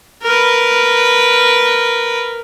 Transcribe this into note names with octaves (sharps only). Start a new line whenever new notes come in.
A#4 B4